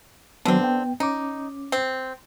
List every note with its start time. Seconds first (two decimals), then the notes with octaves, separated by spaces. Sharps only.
0.45 D3 D#3 F#3 B3 C4
0.61 B3 G5
1.00 C#4 D#4 D6
1.72 C4